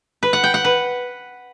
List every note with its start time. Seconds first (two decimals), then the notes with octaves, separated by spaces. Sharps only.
0.23 B4
0.33 F#5
0.44 G5
0.54 F#5
0.65 B4